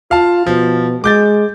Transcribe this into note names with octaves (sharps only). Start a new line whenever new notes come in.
F4 F5 A5
B2 F3
G#3 D6 G6 A6